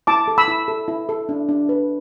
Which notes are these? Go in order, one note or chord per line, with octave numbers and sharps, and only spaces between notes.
E4 A5 D6
A4
B5 E6
E4
A4
E4
A4
D4
D4
B4